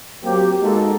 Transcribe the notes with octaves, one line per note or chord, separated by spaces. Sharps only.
F#3 A#3 C4 G4
G#3 A#3 D#4 F#4 A4